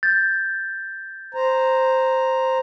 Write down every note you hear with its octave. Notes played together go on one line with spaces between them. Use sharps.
G6 A6
C5 A#5